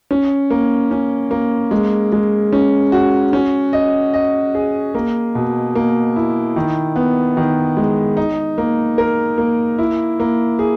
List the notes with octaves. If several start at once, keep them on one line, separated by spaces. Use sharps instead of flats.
C#4
A#3
C#4
A#3
G#3
G#3
C#4
F#4
C#4
D#5
D#5
G#4
A#3
B2
A#3
E4
D#3
B3
D#3
G#3
D#4
A#3
A#4
A#3
E4
A#3
G#4